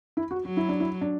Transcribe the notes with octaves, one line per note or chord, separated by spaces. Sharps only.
E4
F#4
F#3 F#4
E4
D4
E4
D4